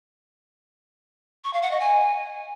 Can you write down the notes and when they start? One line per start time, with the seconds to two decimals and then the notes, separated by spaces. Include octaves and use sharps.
1.44 C#6
1.53 F5
1.62 F#5
1.71 D#5
1.80 G#5